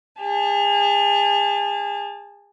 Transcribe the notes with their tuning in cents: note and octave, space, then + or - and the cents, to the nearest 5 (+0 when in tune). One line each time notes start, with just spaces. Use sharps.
G#4 -35 A5 -15